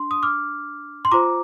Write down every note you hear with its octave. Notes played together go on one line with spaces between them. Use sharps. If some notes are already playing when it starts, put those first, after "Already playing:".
Already playing: D4 C6
D#6
D6 F6
C6
F4 C5 A#5 D6